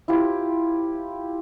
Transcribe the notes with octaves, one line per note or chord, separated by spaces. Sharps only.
E4 F4 G4 C5